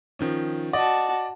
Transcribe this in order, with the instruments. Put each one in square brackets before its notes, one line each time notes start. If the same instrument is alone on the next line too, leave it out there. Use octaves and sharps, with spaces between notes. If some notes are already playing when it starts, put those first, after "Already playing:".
[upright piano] D#3 F3 C#4
[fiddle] F#4 A5 [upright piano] D5 D#5